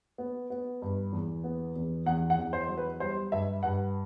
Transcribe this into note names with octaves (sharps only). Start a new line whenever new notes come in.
B3
B3
G2
E2
B3
E2
E2 F#5
F#5
E2
C5
F#3
B4
G3 C5
G2 E5
G2 F#5